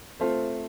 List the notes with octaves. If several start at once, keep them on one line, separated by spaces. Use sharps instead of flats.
A3 C4 F4 A4 C5